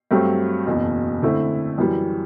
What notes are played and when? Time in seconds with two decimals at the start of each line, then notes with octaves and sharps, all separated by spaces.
0.11 G2 F#3 A3 C4 G4
0.66 F#1 E2 B2
1.22 D3 A3 C4 E4
1.78 F#2 E3 G3